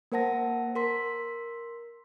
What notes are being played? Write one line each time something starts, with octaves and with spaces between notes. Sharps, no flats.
A#3 A#4 C5 F#5 A5 A#6
A#4 C6 B6